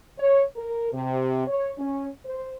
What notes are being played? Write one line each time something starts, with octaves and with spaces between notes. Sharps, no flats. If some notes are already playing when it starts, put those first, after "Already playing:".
C#5
A#4
C3
C#5
C#4
C5